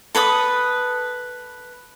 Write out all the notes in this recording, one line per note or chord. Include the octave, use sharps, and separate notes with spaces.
A4 B4 B5 D#6